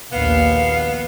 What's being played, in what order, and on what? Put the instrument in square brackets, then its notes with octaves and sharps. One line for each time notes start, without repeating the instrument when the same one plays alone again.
[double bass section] A#1 D#2 [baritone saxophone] B3 [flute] F5